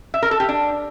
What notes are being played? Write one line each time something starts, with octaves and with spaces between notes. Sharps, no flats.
E5
A#4
A4
G4
D4